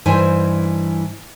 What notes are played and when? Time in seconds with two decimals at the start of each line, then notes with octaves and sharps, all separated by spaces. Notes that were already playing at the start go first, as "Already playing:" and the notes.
0.06 G2 E3 D#4 C5 G#5